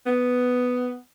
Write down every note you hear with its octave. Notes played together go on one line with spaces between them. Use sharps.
B3